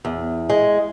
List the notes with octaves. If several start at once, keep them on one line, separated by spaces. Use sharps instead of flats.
E2
G#3